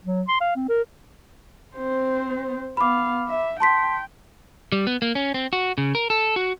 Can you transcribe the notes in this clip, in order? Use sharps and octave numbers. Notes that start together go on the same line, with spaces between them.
F#3
C6
F5
C4
A#4
C4 C5
B3 F5 B5 D6
E5
G5 A5 C6 B6
G3
B3
A#3
C#4
C4
F#4
C#3
A#4
A4
F#4